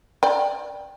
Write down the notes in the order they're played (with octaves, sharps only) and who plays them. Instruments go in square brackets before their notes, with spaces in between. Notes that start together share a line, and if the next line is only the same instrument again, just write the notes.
[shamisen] D5 G5